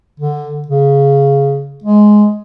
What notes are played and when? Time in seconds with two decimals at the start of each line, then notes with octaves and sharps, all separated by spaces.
0.20 D3
0.67 C#3
1.84 G#3